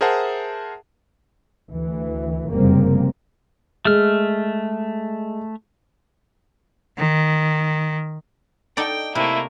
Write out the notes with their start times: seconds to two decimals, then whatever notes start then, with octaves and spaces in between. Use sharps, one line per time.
0.01 G#4 A#4 C5 E5 F#5 A5
1.71 D2 E3
2.50 F1 F#2 C#3 G3 A#3 C4
3.85 G#3 A3 F6
6.97 D#3
8.77 D#4 A4 D5 G5
9.15 C3 A3 A#3 E4